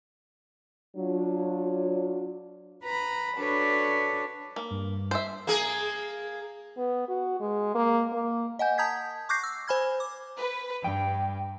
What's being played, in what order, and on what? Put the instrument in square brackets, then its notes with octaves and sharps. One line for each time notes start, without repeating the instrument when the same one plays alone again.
[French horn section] F#3 D4 F4
[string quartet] B4 A#5 B5
D4 F#4 A4 B4 C#5 D5
[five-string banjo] A#3
[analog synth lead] G2
[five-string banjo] C5 E5
[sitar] A#3 G#4
[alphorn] B3
F#4
G#3
A#3
A#3
[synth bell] D#5 F#5 G#5 G6
A5 A#5 D#6 G6 G#6 B6
C#6 D6 F#6 G6 A#6 C7
E6
C5 G#5 B5 F6 G#6
D6
[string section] B4
[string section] G2 [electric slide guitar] G5